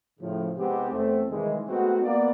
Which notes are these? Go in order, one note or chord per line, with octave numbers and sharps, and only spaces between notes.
A2 C#3 F3
C3 G#3 B3 C4 D#4 G4
E2 A3 C4
C3 D#3 E3 G3 G#3
G#3 A3 B3 C4 D#4 F#4
A#3 B3 D5